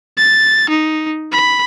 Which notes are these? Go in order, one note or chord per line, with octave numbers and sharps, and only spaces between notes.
A6
D#4
B5